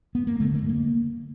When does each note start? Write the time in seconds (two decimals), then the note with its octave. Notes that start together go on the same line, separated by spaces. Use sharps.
0.15 B3
0.27 A#3
0.40 D3 A3
0.55 A#3
0.63 G2
0.69 A#3